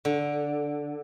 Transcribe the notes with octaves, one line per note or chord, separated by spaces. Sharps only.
D3